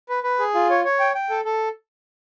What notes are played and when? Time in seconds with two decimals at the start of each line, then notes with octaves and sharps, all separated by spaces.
0.09 B4
0.23 B4
0.39 G#4
0.55 F4
0.70 C#5
0.85 C#5
1.00 G5
1.15 G5
1.30 A4
1.45 A4